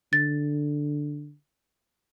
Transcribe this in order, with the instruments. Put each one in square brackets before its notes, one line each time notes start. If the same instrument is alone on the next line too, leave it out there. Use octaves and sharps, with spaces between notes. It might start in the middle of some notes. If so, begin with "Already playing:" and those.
[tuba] D3 [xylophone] A6